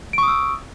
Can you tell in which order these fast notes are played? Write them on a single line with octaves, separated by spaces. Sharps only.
D7 C#6 D#6 E6